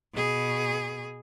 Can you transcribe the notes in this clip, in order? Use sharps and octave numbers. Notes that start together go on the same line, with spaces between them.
B2 G#4